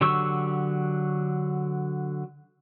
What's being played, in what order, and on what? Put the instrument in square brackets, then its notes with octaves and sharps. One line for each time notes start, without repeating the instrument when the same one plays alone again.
[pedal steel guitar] D3 F#3 G4 C#6 E6